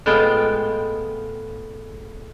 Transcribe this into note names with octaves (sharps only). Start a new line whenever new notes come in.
A2 G#3 B3 F4 G5